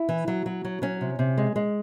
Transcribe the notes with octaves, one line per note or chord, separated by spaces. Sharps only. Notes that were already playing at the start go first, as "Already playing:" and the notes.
Already playing: E4
E3
F#3
F#3
F#3
F#3 C#4
C3
C3
G#3
G#3